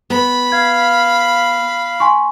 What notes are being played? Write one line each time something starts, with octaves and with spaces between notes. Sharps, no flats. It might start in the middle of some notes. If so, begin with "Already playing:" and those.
B3 B5
F5 G#6
G#5 C6 C#6